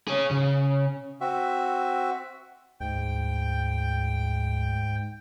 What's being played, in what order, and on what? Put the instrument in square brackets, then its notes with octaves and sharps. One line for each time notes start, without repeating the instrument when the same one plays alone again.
[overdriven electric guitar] G#4 C#5
C#3
[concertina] C4 F#4 E5
[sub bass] D2 [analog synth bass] G#2 [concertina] G5